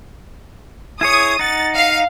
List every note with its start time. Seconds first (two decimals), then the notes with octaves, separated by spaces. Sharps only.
1.01 E4 G#4 C#5 D#6 G#6
1.39 D#4 F#5 A6
1.75 F5